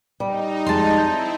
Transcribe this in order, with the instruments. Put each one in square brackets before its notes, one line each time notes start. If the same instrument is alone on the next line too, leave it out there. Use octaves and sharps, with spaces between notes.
[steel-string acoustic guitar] G3 [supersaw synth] D#4
[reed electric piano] F2 G#3 [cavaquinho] A5 C6
[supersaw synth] C4 E4 [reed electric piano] G6